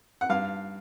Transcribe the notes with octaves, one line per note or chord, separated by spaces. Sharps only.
F#5
G2 F5